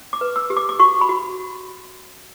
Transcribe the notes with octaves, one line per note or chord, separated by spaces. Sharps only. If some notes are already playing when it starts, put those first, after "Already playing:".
Already playing: C#4
D6
B4
E6
G4
D6
D6
F#4 C#6
B5
F#4